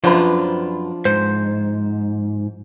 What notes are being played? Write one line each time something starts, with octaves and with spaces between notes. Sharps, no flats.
F#2 F3 D4 F4 B4 A#5
G#2 C5